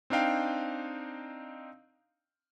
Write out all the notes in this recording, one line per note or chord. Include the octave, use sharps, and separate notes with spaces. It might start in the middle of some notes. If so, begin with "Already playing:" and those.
C4 D4 D#4 F5 G5